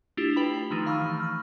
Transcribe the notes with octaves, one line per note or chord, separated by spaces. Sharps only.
A3 D4 E4 F4 G4
B4 G5 B5
D#3 F3 A3 D#4
F5 B5 C#6 E6 F6
E3
C#6 F6